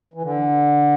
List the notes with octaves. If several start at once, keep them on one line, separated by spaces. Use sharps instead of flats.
E3
D3